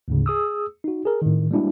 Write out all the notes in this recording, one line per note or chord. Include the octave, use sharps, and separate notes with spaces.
D2 G#2 C#3
G#4 D#6 E6
D#4 F#4
G#4 A#4
A2 D#3
G3 G#3 A#3 D4 E4 F#4